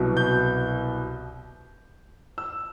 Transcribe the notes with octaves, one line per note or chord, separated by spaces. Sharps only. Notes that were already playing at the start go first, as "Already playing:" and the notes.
Already playing: C2 B2 F#3
G6
E6